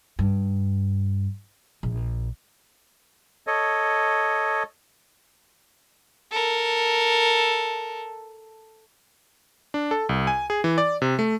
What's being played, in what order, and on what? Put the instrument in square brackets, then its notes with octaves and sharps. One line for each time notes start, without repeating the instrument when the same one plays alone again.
[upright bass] G2
A#1
[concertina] A4 C#5 D#5
[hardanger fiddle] A4 A#4
[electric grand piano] D4
A4
C2
G#5
G#4
E3
D5
C3
A3